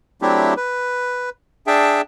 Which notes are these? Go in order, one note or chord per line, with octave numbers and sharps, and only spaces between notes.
F#3 A3 C4 D4 E4 G4
B4
D4 G#4 E5 G5 A5